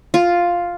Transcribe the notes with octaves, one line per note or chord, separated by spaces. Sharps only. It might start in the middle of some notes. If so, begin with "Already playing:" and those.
F4